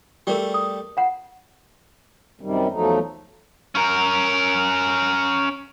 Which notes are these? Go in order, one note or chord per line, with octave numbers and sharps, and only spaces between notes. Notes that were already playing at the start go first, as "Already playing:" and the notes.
G3 A3 G4 G#4 A#4
D#6
F5 F#5
F#2 C3 D#3 G3
E2 F3 F#3 A3 D#4
C#4 A#4